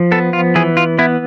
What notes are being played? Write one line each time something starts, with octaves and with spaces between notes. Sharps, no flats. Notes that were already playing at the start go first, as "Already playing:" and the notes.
Already playing: F3
B3 A4
F4
E3 G#4
F4
B3 E4